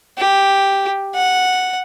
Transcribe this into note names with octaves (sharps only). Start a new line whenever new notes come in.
G4
F#5